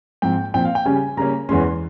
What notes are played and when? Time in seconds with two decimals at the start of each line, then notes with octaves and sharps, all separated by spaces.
0.22 G#2 F3 C4 G5
0.54 A#2 F3 C4 G5
0.65 F5
0.75 G5
0.86 C#3 G3 C#4 G#5
1.17 C#3 G3 A#3 C#4 A#5
1.49 E2 E3 G#3 C#4 C6